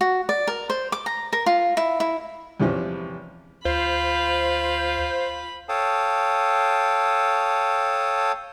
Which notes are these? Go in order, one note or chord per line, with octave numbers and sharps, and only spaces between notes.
F#4
D5
A#4
C5
D6
A#5
A#4
F4
E4
E4
E2 C3 E3 F3 C#4
D2 F4 C5 B5
A4 C#5 F5 G5 A5 D#6